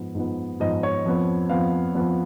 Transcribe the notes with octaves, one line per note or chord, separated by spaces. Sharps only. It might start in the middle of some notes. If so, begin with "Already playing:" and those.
Already playing: G#2 F3 B3
G#2 F3 B3
G#2 F3 B3 D#5
C#5
F2 F3 B3
F2 F3 B3 F5
F2 F3 B3